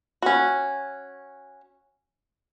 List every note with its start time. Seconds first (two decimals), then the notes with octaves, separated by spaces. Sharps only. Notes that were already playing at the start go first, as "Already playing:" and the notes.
0.22 C#4 F#4